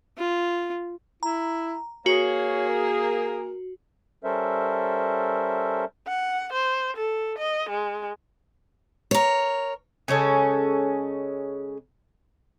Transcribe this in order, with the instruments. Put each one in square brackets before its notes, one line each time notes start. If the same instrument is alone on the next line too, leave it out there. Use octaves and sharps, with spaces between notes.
[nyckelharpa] F4
[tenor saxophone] E4 [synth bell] A#5
[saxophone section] A#3 G#4 [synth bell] F#4 [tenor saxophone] C#5
[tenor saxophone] A#4
[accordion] G3 C#4 A4 A#4 C5 E5
[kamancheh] F#5
C5
A4
D#5
G#3
[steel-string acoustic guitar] A#4 C#5
[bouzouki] C#3 G#3 C#4 A4